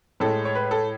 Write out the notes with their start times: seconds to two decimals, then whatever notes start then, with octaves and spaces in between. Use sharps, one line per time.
0.20 A2 G#3 A4
0.45 C#5
0.55 B4
0.71 A4